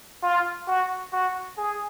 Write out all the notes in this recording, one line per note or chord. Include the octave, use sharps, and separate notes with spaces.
F4
F#4
F#4
G#4